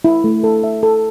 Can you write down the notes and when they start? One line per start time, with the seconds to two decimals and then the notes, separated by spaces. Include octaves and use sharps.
0.04 E4
0.24 A3
0.44 A4
0.64 E5
0.83 A4